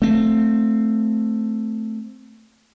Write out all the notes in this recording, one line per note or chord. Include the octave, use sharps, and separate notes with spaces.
A3 C4